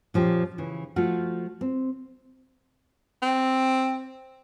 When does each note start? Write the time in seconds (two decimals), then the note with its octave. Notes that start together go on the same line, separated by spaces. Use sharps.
0.14 A#2 F3 C#4 G4
0.58 C#3 E3
0.96 F3 A3 F4 F#4
1.61 C4
3.22 C4